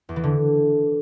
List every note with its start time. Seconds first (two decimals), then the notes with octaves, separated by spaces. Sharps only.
0.09 E2
0.16 E3
0.24 D3